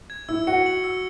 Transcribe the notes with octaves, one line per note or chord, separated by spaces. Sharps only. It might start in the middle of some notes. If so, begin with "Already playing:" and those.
G#6
E4 E6
F#4 C#7
F#7
E6